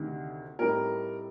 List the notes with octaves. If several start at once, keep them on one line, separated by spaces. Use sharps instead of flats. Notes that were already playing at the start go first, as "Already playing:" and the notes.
Already playing: D2 C3 D#3
A2 G3 C4 D#4 A#4